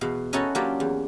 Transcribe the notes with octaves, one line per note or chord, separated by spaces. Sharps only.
E2 B2 F5
C#4 D#4 E4 F#4 A4 C#5
F#3 A#3 C#4 D4 F4 G4
E2